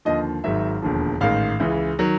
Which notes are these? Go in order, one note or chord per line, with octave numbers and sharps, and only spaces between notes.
D#2 D3 F3 D#5
G#1 G#2 D#3 F#3 E5
E1 D#2 D3 F3
A1 G#2 D#3 F5
C#2 C#3 E3
D#3 F#3